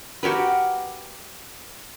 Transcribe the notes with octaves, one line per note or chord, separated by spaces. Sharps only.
F#4 G4 A#4 B4